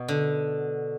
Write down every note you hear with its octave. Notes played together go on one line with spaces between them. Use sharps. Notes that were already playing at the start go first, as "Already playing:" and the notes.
Already playing: B2
D3